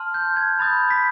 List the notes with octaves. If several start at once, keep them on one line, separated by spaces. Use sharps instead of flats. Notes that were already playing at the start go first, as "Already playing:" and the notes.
Already playing: A5 C6 F6
G6
G#6
B5 D#6 G6 A6
B6